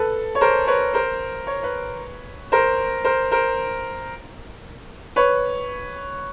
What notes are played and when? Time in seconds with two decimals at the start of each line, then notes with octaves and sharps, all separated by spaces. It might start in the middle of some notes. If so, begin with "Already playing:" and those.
Already playing: A4 B4
0.35 C#5
0.41 A#4 C5
0.67 B4 C#5
0.94 A#4 C5
1.47 C#5
1.63 B4 C#5
2.52 A#4 C5
3.04 A#4 C5
3.31 A#4 C5
5.16 B4 C#5